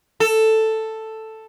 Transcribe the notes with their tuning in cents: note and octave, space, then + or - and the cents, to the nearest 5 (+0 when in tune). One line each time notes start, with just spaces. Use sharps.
A4 +5